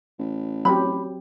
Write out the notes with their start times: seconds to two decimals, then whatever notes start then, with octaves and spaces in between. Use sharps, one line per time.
0.19 A1
0.65 F#3 C4 G4 B5